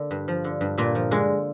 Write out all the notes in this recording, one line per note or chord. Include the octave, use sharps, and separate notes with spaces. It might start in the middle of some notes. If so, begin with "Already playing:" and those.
Already playing: D3 A#3
G2
F3
D3
G2
G2 A#2 A#3
F3
D3 G#3